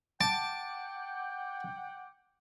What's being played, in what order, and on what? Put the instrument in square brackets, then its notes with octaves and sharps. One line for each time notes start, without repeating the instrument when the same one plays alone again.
[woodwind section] F#5 G5 [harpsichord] A5 [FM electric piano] D6